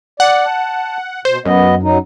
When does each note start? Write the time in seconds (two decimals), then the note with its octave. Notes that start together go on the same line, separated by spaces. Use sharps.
0.20 D5 F#5
0.46 A5
1.25 B2 C5
1.45 F#2 B3 D#5
1.83 F#3 D#4